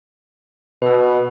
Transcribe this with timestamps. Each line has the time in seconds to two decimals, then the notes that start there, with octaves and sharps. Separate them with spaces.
0.82 B2 B4 E6